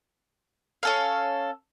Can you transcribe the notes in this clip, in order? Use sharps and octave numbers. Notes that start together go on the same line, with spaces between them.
C#4 A4 F5